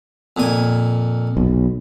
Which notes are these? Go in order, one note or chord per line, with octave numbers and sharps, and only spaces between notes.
F2 A#2 G#5
B1